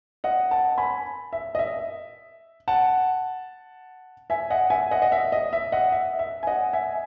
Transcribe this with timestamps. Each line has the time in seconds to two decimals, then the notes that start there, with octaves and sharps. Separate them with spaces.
0.24 D#5 F#5
0.51 F#5 A5
0.78 G#5 B5
1.33 E5
1.55 D#5
1.59 E5
2.68 F#5 A5
4.30 E5 G#5
4.50 D#5 F#5
4.70 E5 G#5
4.91 D#5 F#5
5.02 D#5
5.12 E5
5.32 D#5
5.53 E5
5.72 D#5 F#5
5.92 E5
6.19 E5
6.43 G#5
6.47 D#5 F#5
6.73 E5 G#5